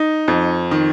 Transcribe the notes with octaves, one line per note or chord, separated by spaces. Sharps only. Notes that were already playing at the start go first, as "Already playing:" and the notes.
Already playing: D#4
F2
D#3